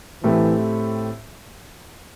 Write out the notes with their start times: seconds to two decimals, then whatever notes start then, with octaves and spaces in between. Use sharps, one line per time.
0.24 A2 E3 A3 C4 G4